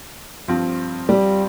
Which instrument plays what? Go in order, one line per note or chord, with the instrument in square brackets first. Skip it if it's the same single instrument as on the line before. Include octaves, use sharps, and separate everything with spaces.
[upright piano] G2 F3 C4 F4
[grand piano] G3